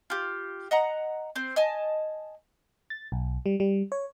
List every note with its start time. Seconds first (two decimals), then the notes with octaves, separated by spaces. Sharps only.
0.10 F4 G4
0.71 D#5 F#5 A#5
1.36 C4 C5
1.56 D#5 G#5 A5
2.90 A6
3.12 B1
3.46 G3
3.60 G3
3.92 C#5